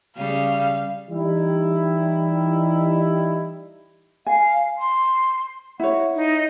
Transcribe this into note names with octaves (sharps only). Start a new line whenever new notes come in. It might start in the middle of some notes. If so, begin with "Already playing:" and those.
C#3 G3 F5
E3 G3 D#4 E4
F5 G#5
C6
E4 C#5 F#5
D#4